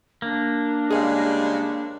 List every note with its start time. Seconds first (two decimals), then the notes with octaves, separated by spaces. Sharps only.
0.22 A#3 D4
0.91 C#3 G3 G#3 G#4 F5